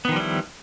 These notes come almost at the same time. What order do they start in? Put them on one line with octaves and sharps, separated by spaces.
B3 D#3 F3 G3 E4